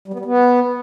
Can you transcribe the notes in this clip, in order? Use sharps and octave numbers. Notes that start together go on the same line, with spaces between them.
G3
B3
G3
B3